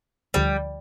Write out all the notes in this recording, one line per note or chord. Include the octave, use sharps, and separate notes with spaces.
D2 D3 F3 G3